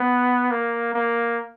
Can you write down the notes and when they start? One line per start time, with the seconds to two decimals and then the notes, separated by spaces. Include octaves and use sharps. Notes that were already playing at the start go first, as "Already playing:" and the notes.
Already playing: B3
0.51 A#3
0.94 A#3